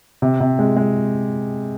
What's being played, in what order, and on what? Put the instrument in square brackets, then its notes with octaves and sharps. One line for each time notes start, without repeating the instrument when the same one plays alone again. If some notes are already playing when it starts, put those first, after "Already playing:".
[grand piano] C3
C3
G#3
G#3